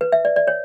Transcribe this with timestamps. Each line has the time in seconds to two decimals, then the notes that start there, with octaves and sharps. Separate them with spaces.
0.01 B4
0.12 E5
0.25 D5
0.36 D5
0.47 C#5